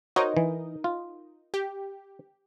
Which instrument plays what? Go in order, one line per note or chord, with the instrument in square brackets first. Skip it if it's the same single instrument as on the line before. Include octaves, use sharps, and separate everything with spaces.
[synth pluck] D#4 A#4 D#5 [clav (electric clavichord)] F#4 C5 C#5
[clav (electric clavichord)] E3
F4
[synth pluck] G4